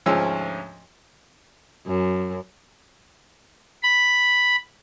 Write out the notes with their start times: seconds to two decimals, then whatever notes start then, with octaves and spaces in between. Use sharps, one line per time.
0.06 D2 G#2 F3 C#4 E6
1.86 F#2
3.83 B5